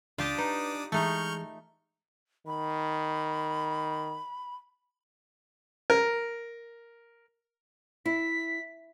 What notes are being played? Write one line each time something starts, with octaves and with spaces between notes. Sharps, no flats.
C#2 D4 F4 G4 A5 D6 D#6
D#4 B4
E3 G#3 A3 D#4 G#4 C#6 F6 G6
D#3 B5
A#4
E4 B6